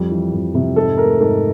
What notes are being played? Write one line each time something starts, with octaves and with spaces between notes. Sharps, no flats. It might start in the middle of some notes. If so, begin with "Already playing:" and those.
Already playing: F2 G3
E3
F2
C3
G#2 A4
A3 A#4
G#2 A4